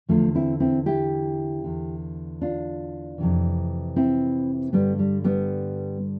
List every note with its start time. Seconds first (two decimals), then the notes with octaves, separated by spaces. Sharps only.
0.08 E2 D3 F3 A3
0.35 C4 E4
0.60 C4 E4
0.86 E4 G4
1.64 E2 D3
2.41 D4 F4
3.18 F2 C3 E3
3.96 C4 E4
4.73 G2 D3 G3 B3
4.99 G3
5.24 G3 B3